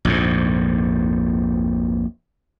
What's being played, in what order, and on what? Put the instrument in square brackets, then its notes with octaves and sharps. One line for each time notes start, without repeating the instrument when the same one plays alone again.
[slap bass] A#1 F2 G#2